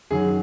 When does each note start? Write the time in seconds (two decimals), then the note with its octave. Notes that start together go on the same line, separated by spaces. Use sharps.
0.10 F#2 D#3 F#3 G#4